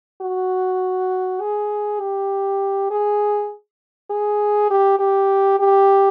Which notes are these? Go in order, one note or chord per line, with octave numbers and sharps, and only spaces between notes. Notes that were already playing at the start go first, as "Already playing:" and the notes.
F#4
G#4
G4
G#4
G#4
G4
G4
G4